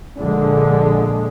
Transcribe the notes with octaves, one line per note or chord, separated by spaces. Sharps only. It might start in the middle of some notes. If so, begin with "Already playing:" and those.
A#1 D3 G#3